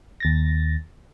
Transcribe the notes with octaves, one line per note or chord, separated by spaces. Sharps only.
D#2 A6 A#6